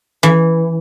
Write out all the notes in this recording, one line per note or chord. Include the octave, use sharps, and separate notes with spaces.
E3